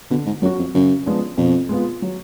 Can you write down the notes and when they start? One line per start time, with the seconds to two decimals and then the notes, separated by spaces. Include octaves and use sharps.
0.10 B2 D3
0.26 G#2
0.42 F#2 F#3 C#4 F#4
0.59 F2
0.74 F#2 C#3
1.06 F3 G#3 B3 D4
1.37 F2 B2
1.69 G#3 B3 F4
2.02 F#3